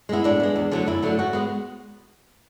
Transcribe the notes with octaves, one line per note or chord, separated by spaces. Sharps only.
G#3 B3 E4
A2 D4
G#3 B3
E2
D3 F#3 A3
F#2 E4
D3 F#3 A3
G#2 F#4
G#3 B3